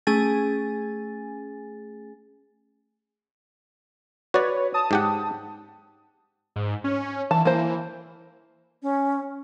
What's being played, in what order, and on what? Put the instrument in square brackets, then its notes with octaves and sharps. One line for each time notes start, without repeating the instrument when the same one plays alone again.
[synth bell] A3 C#4 G#4 G#5 A6
[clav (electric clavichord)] F#4 D5 [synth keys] B4 C#5
[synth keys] A5 D#6
[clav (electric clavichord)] G#2 G4 F#5
[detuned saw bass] G#2
C#4
[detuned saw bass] E3 [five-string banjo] A5
[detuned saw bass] E3 [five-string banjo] A#3 C5
[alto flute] C#4